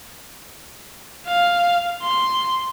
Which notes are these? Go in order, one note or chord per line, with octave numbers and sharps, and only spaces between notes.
F5
C6